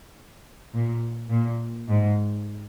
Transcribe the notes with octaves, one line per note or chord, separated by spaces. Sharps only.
A#2
A#2
G#2